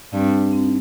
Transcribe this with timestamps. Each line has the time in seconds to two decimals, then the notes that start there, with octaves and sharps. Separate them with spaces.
0.13 G2 C4
0.52 C4
0.63 D#4